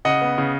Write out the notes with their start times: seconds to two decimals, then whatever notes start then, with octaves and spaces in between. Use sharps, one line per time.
0.05 C#3 D#5 F#5
0.21 B3
0.38 C#3